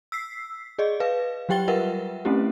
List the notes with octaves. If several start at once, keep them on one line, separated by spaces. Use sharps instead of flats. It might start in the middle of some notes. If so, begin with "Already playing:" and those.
E6 B6 C7
G#4 D5 D#5
B4 F5
F#3 G3 G4 G5 A6 G7
F4 A#4 B4 E5 F#5
A3 C4 C#4 E4 G4